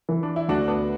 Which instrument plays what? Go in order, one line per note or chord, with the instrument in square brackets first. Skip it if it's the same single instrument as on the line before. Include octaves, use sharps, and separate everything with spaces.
[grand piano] E3
[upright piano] D4
E4
[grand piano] D2 [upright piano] D4 F#4
[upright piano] B3 D4